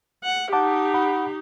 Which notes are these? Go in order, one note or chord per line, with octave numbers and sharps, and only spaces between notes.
F#5
D#4 G4 F#5 A5 D6
F#5 B5